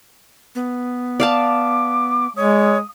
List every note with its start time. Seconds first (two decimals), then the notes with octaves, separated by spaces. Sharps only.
0.55 B3
1.20 D5 F5 A5 D6
2.36 G#3 C#5 D#6